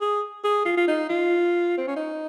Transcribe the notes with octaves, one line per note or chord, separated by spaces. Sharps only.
G#4
G#4
F4
F4
D#4
F4
C4
C#4
D#4